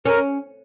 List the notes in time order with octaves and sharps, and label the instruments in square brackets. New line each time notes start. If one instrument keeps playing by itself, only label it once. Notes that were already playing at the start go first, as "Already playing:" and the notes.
[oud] C#4 [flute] A#4